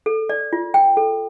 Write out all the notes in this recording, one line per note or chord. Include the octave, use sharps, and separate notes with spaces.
A4
D5
F4
G5
A4